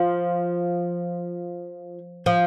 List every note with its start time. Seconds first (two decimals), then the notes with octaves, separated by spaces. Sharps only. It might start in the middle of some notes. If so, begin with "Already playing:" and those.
Already playing: F3
2.26 F3